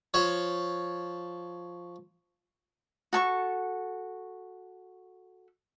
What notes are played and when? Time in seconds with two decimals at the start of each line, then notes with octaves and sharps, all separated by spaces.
0.14 F3 C#5
3.13 F#4 A4 C#6